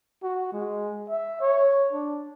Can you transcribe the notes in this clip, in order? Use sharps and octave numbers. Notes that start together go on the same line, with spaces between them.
F#4
G#3
E5
C#5
D4